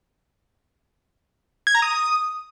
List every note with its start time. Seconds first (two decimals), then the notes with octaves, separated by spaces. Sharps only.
1.67 G#6
1.75 A#5
1.82 D#6